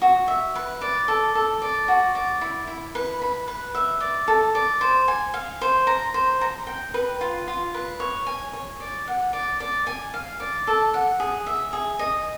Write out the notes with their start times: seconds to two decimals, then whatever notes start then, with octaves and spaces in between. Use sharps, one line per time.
0.02 F#4
0.28 E5
0.56 B4
0.81 D5
1.08 A4
1.35 A4
1.62 D5
1.88 F#4
2.15 D5
2.41 E4
2.67 E4
2.95 B4
3.22 B5
3.48 B4
3.75 E5
4.00 D5
4.28 A4
4.55 D5
4.81 C5
5.08 G#5
5.34 F5
5.61 C5
5.87 A#5
6.14 C5
6.41 A#5
6.67 G5
6.94 B4
7.21 F4
7.48 F4
7.74 B4
8.00 C#5
8.27 G#5
8.53 C#5
8.80 D5
9.07 F#5
9.33 D5
9.60 D5
9.87 G#5
10.14 F5
10.40 D5
10.67 A4
10.94 F#5
11.20 G#4
11.46 E5
11.73 G#4
11.99 D#5